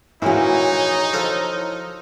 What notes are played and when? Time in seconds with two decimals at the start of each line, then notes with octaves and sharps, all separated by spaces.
0.22 A#1 A#2 E3 D#4 E4 F#4 C#5
1.13 F3 A4 D#5